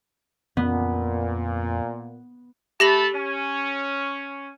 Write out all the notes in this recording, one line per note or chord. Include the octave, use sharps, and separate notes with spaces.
F2 A#2 B3
A3 G4 A5 B5 A#6 F#7
C#4